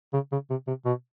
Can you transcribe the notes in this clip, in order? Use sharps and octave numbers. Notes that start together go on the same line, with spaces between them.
C#3
C#3
C3
C3
B2